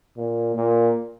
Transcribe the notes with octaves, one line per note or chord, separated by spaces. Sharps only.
A#2
A#2